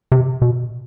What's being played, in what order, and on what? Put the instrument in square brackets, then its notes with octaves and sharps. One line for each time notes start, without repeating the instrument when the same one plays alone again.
[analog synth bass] C3
B2